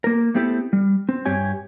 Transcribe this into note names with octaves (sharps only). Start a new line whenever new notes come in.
A#3 A#4
A3 B3 C4 E4 G4 A4
G3
C4
G2 G4 C#5 G#5